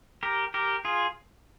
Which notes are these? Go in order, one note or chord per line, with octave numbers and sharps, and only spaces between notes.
G4 A#4
G4 A#4
F4 G#4